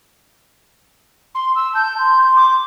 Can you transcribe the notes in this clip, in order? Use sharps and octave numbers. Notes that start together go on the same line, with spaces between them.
C6
E6
A5 G6
C6
D6